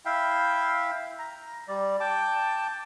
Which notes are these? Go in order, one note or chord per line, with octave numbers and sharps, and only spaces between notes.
E4 E5 F5 G5
A#5
G3 D5
G5 A5 D6